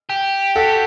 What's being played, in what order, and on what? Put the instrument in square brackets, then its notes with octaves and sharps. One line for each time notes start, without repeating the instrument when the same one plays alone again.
[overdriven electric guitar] G4
[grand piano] F#4 A4